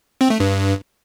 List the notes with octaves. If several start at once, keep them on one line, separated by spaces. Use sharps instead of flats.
C4
A3
G2